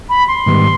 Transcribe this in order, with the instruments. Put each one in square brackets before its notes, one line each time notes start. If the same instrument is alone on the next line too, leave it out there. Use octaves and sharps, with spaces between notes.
[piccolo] B5
C6
[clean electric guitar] G#2 D#3 G3 B3